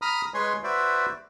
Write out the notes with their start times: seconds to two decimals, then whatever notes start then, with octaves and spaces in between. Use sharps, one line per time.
0.02 A#5 B5 D#6 F6
0.34 G#3 B4 C#5 G#5 C6
0.64 F#4 B4 C5 D5 E5